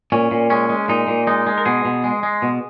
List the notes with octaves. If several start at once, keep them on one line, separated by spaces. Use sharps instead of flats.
A#2 C#4
A#2
G#3 C#4
G#3
A#2 D#4
A#2
G#3 D#4
G#3
A#4
B2 G#4
B2
G#3
G#3
B2